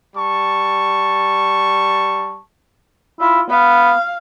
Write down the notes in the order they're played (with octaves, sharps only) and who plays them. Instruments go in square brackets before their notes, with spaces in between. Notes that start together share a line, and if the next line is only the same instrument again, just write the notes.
[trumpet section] G3 A5 C#6
[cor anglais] E4 [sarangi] F4
[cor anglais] B3 [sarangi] F5